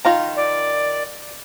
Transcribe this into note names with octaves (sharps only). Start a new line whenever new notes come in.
D#3 F4 A#5
D5